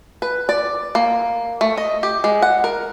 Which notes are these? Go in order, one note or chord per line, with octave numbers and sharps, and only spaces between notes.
B4
D5
A#3
A3
D#5
G4
G#3
F#5
A#4